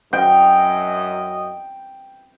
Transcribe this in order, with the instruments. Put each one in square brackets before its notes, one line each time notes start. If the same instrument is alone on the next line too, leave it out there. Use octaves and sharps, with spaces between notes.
[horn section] F#2 D#5 [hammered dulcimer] G5